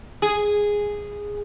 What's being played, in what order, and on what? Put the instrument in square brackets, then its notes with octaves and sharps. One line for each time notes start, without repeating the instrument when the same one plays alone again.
[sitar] G#4